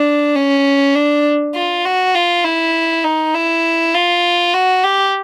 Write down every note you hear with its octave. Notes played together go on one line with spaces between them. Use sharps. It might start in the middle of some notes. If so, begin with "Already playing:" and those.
Already playing: D4
C#4
D4
F4
F#4
F4
E4
D#4
E4
F4
F#4
G4